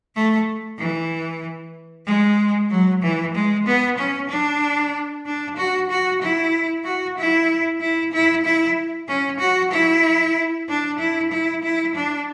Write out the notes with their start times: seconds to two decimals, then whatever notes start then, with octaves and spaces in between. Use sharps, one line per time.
0.15 A3
0.78 E3
2.06 G#3
2.70 F#3
3.02 E3
3.34 G#3
3.66 B3
3.97 C#4
4.29 D4
5.26 D4
5.57 F#4
5.90 F#4
6.22 E4
6.84 F#4
7.18 E4
7.81 E4
8.12 E4
8.45 E4
9.08 C#4
9.40 F#4
9.72 E4
10.68 D4
10.99 E4
11.32 E4
11.63 E4
11.95 D4